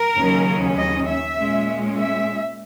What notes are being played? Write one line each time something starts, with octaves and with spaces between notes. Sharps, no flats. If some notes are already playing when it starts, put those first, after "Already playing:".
Already playing: A#4
D#2 C#3 F#3 C#4
D#5
E5
A#2 G#3 C#4
E5